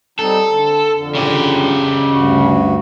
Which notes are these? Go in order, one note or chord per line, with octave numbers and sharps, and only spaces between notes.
G3 C4 D#4 A4
D3
F2 D3
C#3 G4
D2 G2 F#4